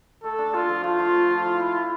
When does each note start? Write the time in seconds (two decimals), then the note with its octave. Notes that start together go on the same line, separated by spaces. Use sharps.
0.23 A3 A4
0.39 D4
0.54 D4 F4
0.69 F3
0.84 A3 F4
0.99 F3
1.15 A3
1.30 F3
1.45 E4
1.60 E4
1.75 E4